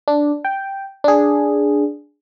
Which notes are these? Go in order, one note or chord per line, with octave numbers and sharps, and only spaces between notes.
D4
G5
D4 G#4